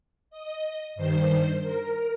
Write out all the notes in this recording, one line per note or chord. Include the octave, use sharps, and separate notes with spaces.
D#5
G2 D#3 C5
A#4